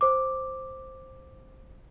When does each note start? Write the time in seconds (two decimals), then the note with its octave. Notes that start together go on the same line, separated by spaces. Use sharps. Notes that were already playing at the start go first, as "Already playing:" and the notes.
0.01 C5 D6